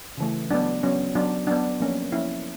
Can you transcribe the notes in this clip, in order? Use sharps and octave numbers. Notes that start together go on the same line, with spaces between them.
C#3 E3 A3
F#3 B3 D4
F#3 B3 C#4
F#3 B3 D4
F#3 B3 D4
F3 A#3 C#4
F3 A#3 C#4 E4